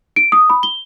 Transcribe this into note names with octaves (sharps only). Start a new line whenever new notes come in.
D7
D#6
B5
G7